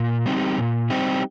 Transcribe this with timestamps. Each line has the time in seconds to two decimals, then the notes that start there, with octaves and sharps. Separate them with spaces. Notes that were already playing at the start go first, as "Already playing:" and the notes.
Already playing: A#2
0.26 G3 C4 D#4 G4
0.58 A#2
0.90 G3 C4 D#4 G4